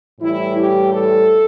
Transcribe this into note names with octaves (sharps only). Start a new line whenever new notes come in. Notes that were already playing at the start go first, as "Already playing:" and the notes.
A2 E3 G3 E4
G4
A4